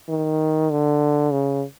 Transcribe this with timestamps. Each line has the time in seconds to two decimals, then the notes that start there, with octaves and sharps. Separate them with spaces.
0.09 D#3
0.71 D3
1.32 C#3